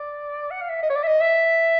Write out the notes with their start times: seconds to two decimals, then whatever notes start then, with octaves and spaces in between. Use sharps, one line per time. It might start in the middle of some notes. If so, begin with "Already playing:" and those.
Already playing: D5
0.51 F#5
0.61 F5
0.69 E5
0.83 D#5
0.90 C#5
0.96 D5
1.03 E5
1.07 D#5
1.21 E5